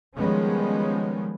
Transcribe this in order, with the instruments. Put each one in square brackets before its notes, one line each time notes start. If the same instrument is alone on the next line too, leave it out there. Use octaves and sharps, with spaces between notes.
[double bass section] D#3 F3 G3 G#3 B3 C#4